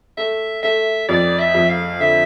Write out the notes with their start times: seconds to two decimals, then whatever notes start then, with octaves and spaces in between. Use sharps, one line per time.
0.17 A3 E5
0.63 A3 E5
1.09 F2 D5
1.39 E5
1.54 F2
1.69 F5
2.00 D3 E5